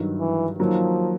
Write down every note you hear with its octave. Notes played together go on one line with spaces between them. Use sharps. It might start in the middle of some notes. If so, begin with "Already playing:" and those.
Already playing: G2 D#3 F#3
E3
D#3 F3 F#3 A#3